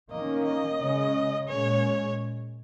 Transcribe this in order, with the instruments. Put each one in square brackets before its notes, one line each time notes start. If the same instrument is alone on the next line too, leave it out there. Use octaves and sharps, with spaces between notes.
[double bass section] D#3 A#3 C#4 [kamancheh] D#5
[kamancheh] D#5
[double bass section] C#3 G#3 C#4
[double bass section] A#2 G#3 C#4 [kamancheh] C#5